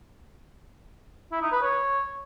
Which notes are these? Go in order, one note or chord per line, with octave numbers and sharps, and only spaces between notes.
E4
D#4
B4
C#5